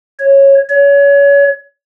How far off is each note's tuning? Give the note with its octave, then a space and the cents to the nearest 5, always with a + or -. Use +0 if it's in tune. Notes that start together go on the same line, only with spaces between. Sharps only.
C#5 -10
C#5 +30